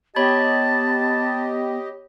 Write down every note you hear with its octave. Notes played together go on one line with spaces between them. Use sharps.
B3 G4 C#5 D#5 A5 B5 G#6